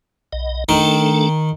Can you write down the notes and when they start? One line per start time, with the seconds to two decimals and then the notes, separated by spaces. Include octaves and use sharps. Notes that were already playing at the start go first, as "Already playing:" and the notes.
0.33 B1 D#5
0.69 D#3 A3 D4 A4